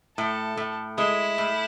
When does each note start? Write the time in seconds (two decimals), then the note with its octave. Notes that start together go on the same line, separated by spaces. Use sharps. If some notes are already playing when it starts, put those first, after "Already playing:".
0.17 A2 A4
0.57 A2
0.98 G#3 E4
1.38 A2